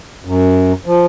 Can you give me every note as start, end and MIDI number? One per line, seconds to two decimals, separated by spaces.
0.25 0.72 42
0.86 1.06 53